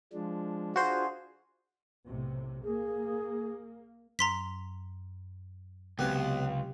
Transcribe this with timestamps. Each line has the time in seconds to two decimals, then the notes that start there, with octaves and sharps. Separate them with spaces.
0.13 F3 G#3 D4
0.76 D4 F4 F#4 G#4 C5
2.07 B1 A2 C3
2.64 A#3 G#4
4.19 F#2 A#5 C6 B6
5.99 C#2 C3 F#3 B3 G4